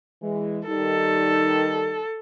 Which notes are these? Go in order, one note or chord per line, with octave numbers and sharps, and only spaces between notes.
E3 G#3
D#3 G3 D#4 A4